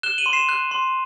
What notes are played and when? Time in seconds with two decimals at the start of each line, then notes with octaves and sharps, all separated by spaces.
0.03 F#6 E7 G7
0.18 D#7 F#7
0.26 C6
0.33 C7 E7
0.49 F#6
0.71 C6